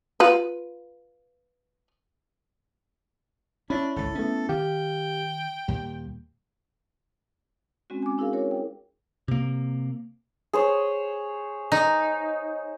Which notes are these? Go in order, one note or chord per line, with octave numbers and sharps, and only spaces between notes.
F4 B4
C#4 D4 E4 C#5 B5
G#1 C#2 A4
A3 B3 C#4 E4
D#3 G4 F5 G5
D#2 A#2 G3
G#3 C4 C#4 F#4
G#5 D6
D4 E4 F#4 G#4 A#4 F5
F#4 A#4 C#5
G5
C3 A#3
G#4 C5 C#5
D#4